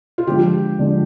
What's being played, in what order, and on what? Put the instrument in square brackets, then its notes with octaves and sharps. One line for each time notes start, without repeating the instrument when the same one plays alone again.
[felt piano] F4
[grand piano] D3 F3 G#3 [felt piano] G4
[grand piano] D3 F3 G#3